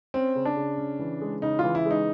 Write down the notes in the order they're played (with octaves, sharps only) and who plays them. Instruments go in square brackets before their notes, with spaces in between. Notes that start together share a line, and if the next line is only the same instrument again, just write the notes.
[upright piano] C4 [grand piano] C#4
[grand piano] C#3
[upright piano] D4
[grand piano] C#3
C#4
E3
G#3
[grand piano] C#3 [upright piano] D#4
[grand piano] E3 [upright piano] F4
[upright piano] E4
[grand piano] G#3
[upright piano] D#4